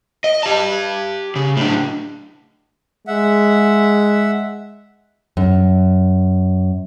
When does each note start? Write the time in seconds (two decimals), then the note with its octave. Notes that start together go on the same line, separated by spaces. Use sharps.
0.24 D#5
0.43 G4 A5
1.36 C#3
1.57 A2 D4
3.07 G#3 E5 F#5
5.37 F#2